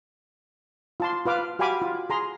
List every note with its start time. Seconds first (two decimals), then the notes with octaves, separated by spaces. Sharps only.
1.00 F4 A5 C6
1.26 F4 B4 F5 D6
1.59 F#4 G4 F5 G#5 B5 D6
1.82 F4
2.10 G#4 A#5 C6